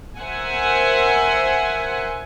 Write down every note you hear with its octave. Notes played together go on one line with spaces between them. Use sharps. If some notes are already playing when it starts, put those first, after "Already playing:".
A#4 C5 E5 F#5 G#5